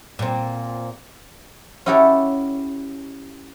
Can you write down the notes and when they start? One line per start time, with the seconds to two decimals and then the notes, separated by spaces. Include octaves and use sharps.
0.19 A#2 C4
1.86 C#4 E4 F#4 G4 A4 C#5